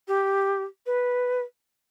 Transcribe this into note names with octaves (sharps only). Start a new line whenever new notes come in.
G4
B4